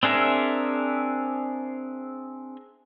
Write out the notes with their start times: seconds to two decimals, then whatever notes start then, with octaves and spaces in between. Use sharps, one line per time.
0.03 C4 D4 G#4 A#4 E5